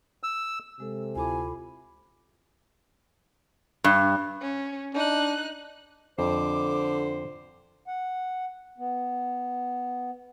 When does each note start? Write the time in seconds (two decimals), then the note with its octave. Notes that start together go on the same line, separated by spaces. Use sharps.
0.23 E6
0.80 C3 G#3 A4
1.16 D2 E4 F4 A4 G#5 B5 D6
3.84 G2
4.41 C#4
4.94 D4 D#4 F#6
6.19 F2 D3 C5 D6
7.87 F#5
8.78 B3